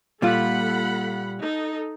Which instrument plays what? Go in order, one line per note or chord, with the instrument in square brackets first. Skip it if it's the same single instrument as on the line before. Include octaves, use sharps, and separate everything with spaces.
[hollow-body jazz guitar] A#2 G3 F4 [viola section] A4 F#5 B5
[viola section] D#4 A4